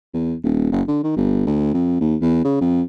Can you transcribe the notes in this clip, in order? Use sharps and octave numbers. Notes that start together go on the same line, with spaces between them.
E2
D#1
F#1
D3
D#3
G1
D2
F2
D#2
E2
C#3
F2